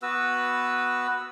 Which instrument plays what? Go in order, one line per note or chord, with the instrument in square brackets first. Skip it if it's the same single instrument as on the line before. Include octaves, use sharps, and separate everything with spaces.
[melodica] B3 F#4 B4 E6